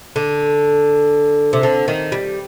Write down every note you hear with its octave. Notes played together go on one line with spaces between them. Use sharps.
D3
C3
D3
D#3
G3